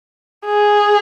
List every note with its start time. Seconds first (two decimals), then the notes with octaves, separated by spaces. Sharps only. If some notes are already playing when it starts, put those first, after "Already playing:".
0.46 G#4